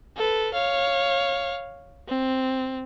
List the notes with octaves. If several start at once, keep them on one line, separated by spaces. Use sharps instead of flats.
A4 B4
C#5 F5
C4